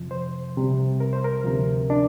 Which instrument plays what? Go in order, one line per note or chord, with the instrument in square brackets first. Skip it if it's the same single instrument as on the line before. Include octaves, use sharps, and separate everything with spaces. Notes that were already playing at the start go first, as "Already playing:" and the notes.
Already playing: [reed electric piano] F2 C3 F3
C5
C2 C3 G3
A#4
C5
A#4
D2 C3 F3
D4